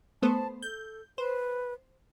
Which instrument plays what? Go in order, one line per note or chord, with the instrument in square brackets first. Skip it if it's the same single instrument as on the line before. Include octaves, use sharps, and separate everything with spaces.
[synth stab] A3 B3 C5 [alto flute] A5
[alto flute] A4 [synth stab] G6
[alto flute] B4 [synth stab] C5